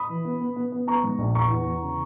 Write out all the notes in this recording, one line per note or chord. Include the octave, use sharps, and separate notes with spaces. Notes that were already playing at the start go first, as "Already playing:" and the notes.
Already playing: B5 D#6
E3
B3
B3
B3
B3
B3 A#5 C#6
G#2
A#1
E2 A#5 C#6
E2
E2
C#3